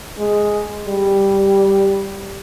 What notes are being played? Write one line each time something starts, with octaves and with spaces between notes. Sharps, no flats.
G#3
G3